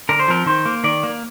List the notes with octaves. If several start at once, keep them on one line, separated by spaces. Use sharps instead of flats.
D3 A#4
C5
F3 C4 A#4
D#3 C5
A#3
D#3 D5
A#3